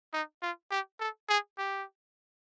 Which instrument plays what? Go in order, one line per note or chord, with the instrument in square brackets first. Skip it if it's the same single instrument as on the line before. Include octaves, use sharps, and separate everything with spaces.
[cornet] D#4
F4
G4
A4
G#4
G4